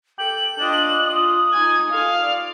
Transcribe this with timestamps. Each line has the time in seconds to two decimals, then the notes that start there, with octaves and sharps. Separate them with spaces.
0.19 A4 G5 F#7
0.59 D4 F4 D#5
1.07 F4 D#6
1.52 D#4 G#5 G#6
1.90 F4 A4 F5
2.22 D5